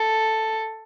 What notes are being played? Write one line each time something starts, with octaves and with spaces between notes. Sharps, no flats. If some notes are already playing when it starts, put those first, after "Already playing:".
Already playing: A4